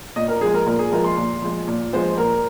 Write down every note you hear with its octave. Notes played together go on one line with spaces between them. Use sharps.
A#2 D#5
A#4
F3 G#3 G#4
A#4
A#2 A#4
G#4
F3 G#3 A#4
C6
A#2
F3 G#3
A#2
F3 G#3 C5
A#2 A#4